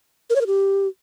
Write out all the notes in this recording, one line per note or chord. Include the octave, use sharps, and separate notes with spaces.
A#4
C#5
A#4
G4